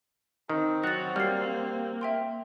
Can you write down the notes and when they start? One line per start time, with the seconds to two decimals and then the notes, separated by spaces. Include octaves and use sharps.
0.49 D#3 C4
0.84 F#3 F#4 F#6 A6
1.16 G3 A#3 F6 C7
2.01 E5 G5 C6